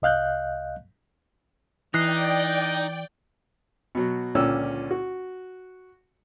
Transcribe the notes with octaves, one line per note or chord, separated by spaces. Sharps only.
C2 D#5 F5 F#6 G6
E3 D#4 D5 G5 D#6 F#6 C7
B2 F#3
C#2 A#2 D3 C#4 G5 E6
F#4